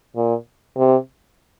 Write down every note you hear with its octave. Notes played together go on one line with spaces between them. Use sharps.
A#2
C3